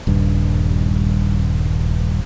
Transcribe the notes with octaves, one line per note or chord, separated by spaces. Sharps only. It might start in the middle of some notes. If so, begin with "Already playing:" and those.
D#1 G2